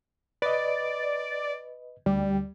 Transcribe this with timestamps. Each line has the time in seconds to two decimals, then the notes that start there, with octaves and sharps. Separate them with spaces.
0.42 B4 D5 D#5
2.06 D2 G3